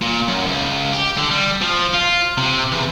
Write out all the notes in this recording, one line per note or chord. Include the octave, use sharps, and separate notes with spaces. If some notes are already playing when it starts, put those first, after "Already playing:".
A#2
F#2
C#2
G4
D3
G3
F3
F4
C3
E2